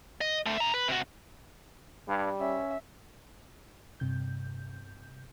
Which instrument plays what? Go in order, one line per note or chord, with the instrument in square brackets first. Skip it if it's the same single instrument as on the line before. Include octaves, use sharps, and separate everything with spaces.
[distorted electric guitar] D#5
D3 A3
E5 A#5
B4
C3 F#4
[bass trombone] G2 [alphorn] G3
[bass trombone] C#4 [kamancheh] E5
[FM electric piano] G2 C3 G6